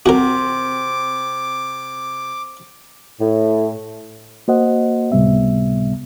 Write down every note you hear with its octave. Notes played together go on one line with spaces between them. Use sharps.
C3 C4 F#4 A#4 F#5 D6
A2
A#3 F#4 C5 D#5 F#5
C#2 A2 C3 G3 B3 E5